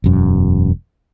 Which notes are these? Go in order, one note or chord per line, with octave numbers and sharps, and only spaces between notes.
E1 F#2